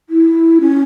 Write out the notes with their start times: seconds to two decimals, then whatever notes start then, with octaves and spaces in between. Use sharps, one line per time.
0.09 E4
0.61 C#4